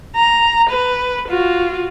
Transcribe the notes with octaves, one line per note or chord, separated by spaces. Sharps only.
A#5
B4
F4 F#4